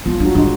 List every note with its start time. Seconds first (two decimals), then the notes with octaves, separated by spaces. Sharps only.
0.05 F3 B3
0.20 D4
0.25 F#3
0.35 G#3 D4